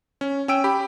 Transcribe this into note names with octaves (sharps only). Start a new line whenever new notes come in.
C#4
C#4 G5 E6 D7
G4 B5